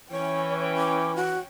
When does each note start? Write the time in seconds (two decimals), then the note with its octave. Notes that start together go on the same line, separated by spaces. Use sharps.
0.12 E3 C#4 C#5 G5
0.77 D6
1.16 F#4